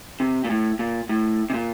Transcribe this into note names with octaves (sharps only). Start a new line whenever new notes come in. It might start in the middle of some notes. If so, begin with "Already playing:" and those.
C3
A#2
A2
A#2
A2
C3
A#2